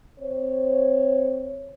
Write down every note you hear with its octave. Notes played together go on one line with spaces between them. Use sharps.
C4 C5 C#5